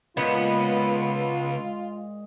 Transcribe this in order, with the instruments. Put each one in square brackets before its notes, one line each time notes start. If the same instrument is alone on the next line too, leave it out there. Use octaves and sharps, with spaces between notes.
[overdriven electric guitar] C#2 [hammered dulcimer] A#2 G#3 [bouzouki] B3 [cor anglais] F4